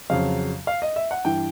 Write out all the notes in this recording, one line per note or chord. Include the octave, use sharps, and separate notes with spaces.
F2 C#3 F#3 F5
F5
D#5
E5
F#5
G2 E3 G5